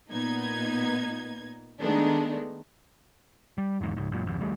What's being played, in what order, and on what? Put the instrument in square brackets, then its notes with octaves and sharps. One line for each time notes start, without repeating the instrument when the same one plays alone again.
[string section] A#2 B3 D#4 G#6
D#3 G#3 A3 B3 D4 D#4
[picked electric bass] G3
G#1 E2 G#2
C#2 G#2
F#2 A#2
G#1 F2
D#2 G3 A3